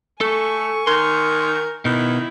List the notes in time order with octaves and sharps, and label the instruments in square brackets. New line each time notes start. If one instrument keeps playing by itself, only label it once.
[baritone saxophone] A3 [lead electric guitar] A4 [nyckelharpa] G#5 C#6
[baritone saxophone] D#3 [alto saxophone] A#4 [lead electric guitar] C6
[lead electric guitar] B2 [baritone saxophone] D#3 [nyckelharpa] E4